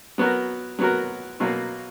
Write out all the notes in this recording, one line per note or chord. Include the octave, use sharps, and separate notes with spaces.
F#3 B3 F#4 A#4
F#3 B3 F#4 A#4
B2 F#3 A#3